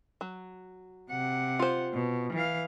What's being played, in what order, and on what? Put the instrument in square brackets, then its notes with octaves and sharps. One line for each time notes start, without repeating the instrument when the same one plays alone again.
[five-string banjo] F#3
[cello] C3 F#5
[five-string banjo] F4 C5
[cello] B2
E3 F5